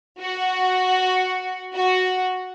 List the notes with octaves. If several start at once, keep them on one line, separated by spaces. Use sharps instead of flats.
F#4
F#4